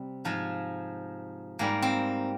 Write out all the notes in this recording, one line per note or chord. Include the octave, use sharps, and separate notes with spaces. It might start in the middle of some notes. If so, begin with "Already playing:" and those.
Already playing: C3 G3
G#2 F3 G#3
G#2 G3 A#3
C4